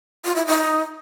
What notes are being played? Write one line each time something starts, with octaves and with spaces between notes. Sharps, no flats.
F4
E4
D#4